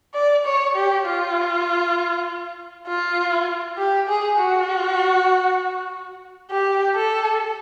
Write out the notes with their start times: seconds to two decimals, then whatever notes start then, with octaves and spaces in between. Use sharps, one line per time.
0.14 D5
0.45 C#5
0.75 G4
1.05 F4
2.87 F4
3.78 G4
4.08 G#4
4.38 F#4
6.51 G4
6.95 A4